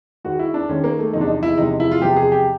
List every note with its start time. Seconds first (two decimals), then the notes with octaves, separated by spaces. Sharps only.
0.24 D#2 D#3 G#3 F#4
0.39 E4
0.54 D4
0.69 D#2 D#3 G#3 C#4
0.84 A#3
0.99 A3
1.13 E2 C3 F3 G#3 D#4
1.21 D4
1.28 D#4
1.43 E4
1.58 E2 C3 F3 G#3 D#4
1.80 E4
1.91 F4
2.02 E2 C3 F3 G#3 G4
2.16 G#4
2.32 G4